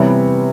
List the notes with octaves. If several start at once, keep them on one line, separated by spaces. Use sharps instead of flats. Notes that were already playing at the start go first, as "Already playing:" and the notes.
Already playing: C3 E3 G3 B3 E4 C#5